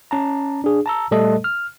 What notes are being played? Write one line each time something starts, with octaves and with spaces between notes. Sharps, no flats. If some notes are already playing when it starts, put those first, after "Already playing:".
C#4 A5 A#5
D4 G#4
A5 A#5 E6
A#2 G3 A3 A4 D#5 A5
F6